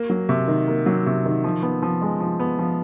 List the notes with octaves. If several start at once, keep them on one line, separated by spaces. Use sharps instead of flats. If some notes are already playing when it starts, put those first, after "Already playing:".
Already playing: A#3
F#3
C3
D#3
A#3
F#3
C3
D#3
F3
B3
F3
G#3
F3
B3
F3